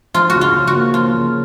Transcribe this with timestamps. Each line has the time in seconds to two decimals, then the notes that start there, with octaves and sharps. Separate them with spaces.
0.14 F3 F4
0.30 F#4
0.35 C#3
0.41 F4
0.54 C#3
0.67 F#4
0.73 A#3
0.93 F3 F4
1.14 C#3